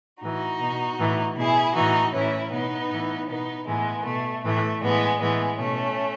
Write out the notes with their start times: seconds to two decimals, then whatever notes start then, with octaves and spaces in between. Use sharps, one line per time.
0.22 A2 E3 D#4 F#4
0.61 B2
1.00 A2 E3
1.37 B2 E4 G#4
1.75 A2 E3 D#4 F#4
2.14 A2 E3 C#4 E4
2.53 B2 B3 D#4
2.91 A2 E3
3.29 B2 B3 D#4
3.68 A2 E3 G#3 B3
4.06 B2 A3
4.44 A2 E3 A3
4.83 A2 E3 G#3 B3
5.21 A2 E3 G#3 B3
5.59 B2 A3 C#4